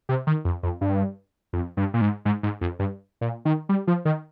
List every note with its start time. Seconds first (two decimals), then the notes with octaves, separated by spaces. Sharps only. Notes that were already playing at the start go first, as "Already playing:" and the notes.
0.09 C3
0.27 D#3
0.45 F2
0.63 F2
0.81 G2
1.53 F2
1.77 G2
1.94 A#2
2.01 G#2
2.25 G#2
2.43 G#2
2.61 F2
2.79 G2
3.21 A#2
3.45 D#3
3.69 G3
3.87 F3
4.05 D#3